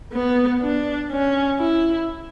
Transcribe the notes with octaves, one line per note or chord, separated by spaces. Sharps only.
B3
D4
C#4
E4